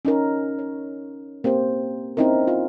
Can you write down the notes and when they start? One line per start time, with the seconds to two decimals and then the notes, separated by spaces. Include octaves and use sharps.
0.05 C#4 D#4 A#4
0.59 C#5
1.44 A#3 C4 G4 C5
2.17 C4 C#4 D#4 E4 A#4
2.48 F4